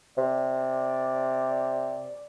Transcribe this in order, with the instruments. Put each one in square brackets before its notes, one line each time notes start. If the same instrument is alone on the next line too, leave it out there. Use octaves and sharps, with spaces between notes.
[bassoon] C3 [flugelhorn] D5